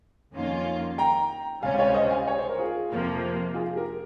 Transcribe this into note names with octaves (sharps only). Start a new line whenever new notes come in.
F2 D#3 A#3 C#4 F4
G5 A#5
C#2 C3 G3 C#4 F5 G#5
C#5 F5
C5 D#5
F5 G#5
C#5
C5
A#4
F4 G#4
F2 C3 F3 A#3
F4 G#4
G4 A#4